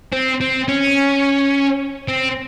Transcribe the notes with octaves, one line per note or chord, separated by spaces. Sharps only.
C4
C4
C#4
C4